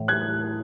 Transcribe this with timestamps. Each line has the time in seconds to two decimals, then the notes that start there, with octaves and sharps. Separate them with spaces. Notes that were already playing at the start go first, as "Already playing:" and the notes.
Already playing: A2 E3
0.08 F#6 G#6